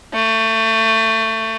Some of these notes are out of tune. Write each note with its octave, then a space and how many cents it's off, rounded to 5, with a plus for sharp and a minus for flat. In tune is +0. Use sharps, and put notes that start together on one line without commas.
A3 +25